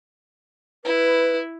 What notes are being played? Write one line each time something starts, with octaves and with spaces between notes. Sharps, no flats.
E4 B4